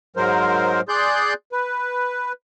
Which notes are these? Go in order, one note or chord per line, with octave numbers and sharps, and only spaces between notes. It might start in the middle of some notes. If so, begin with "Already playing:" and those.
G#2 F#3 G#3 A#4 C5
G#4 D5 C6 F#6 G6
B4